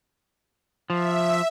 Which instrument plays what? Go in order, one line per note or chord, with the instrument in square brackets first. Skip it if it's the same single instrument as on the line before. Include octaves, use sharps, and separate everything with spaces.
[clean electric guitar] F3 [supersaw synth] E5